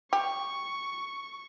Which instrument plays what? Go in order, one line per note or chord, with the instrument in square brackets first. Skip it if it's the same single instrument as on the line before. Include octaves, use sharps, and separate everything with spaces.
[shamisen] G4 [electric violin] C#6